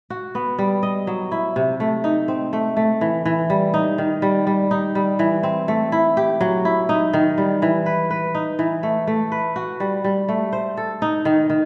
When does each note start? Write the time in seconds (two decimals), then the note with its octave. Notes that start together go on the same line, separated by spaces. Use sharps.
0.10 F#4
0.35 B3
0.59 G3
0.83 D#5
1.07 F#3
1.32 E4
1.56 C3
1.80 A3
2.04 D#4
2.28 C4
2.53 A3
2.77 A3
3.01 E3
3.25 E3
3.50 G3
3.74 D#4
3.98 D#3
4.22 G3
4.47 G3
4.71 D#4
4.95 G3
5.19 E3
5.43 C4
5.68 A3
5.92 E4
6.17 G4
6.41 F#3
6.65 E4
6.89 D#4
7.13 D#3
7.38 G3
7.62 E3
7.86 B4
8.10 B4
8.35 D#4
8.59 E3
8.83 A3
9.07 A3
9.32 B4
9.56 F#4
9.80 G3
10.04 G3
10.29 A3
10.53 C5
10.77 A4
11.02 D#4
11.25 D#3
11.50 D#3